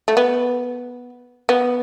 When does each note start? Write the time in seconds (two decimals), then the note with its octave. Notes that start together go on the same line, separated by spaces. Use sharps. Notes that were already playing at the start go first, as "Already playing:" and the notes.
0.08 A3
0.17 B3
1.49 B3